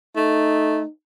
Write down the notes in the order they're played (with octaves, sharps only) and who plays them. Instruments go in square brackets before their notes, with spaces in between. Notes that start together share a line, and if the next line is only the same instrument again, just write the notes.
[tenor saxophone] A3 [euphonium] D#4